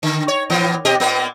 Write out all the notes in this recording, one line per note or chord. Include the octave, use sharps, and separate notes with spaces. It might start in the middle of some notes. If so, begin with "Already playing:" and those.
D3
C#5
A#2 E3 B3
B2 G4 D#5
A#2 A#3 B3